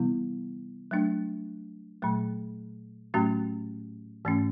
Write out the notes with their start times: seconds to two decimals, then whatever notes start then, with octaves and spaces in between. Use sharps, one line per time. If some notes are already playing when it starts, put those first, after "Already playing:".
Already playing: C3 E3 G3 B3 E4
0.91 F#3 A3 D4
2.02 A#2 F#3 A3
3.14 A2 F#3 A3 C#4 F#4
4.25 G#2 E3 A3 C#4